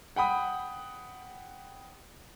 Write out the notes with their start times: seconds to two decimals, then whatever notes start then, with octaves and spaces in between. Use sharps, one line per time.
0.16 F#5 G5 B5 D#6